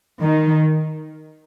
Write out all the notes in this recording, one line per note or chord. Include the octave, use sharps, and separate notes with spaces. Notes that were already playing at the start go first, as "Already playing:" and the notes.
D#3